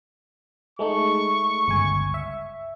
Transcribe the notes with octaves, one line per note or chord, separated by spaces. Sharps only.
G#3 A3 D#4 C#6
G1 C#2 G#5
E5